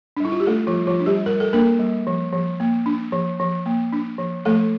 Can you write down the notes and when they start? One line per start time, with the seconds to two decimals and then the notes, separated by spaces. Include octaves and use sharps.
0.17 D4
0.20 G3 E4
0.32 F4
0.40 G4
0.47 A3 D4 A4
0.67 F3 F4
0.74 G3
0.87 F3 F4
1.00 D4
1.06 G3 G4
1.26 G3 A#4
1.40 A4
1.53 A#3 D4 A#4
1.79 G3
2.07 F3
2.33 F3
2.60 A#3
2.86 D4
3.12 F3
3.40 F3
3.66 A#3
3.93 D4
4.19 F3
4.45 F3 A3 A4